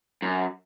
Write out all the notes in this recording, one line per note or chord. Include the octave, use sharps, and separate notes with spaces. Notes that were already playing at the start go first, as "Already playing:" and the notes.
F#2